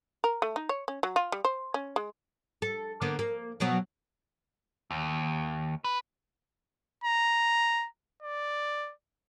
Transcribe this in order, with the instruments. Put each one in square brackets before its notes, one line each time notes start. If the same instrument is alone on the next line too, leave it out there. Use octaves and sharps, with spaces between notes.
[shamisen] A#4
A3
D#4
C#5
C#4
F#3
F4
G3
C5
C#4
G#3
[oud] A4
D3 A#3 B3
A#3
B2 F#3 B3
[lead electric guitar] D#2
B4
[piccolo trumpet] A#5
D5